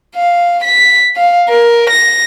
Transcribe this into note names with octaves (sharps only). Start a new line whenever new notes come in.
F5
B6
F5
A#4
A#6